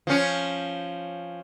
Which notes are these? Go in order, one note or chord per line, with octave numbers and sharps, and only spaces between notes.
F3 C#4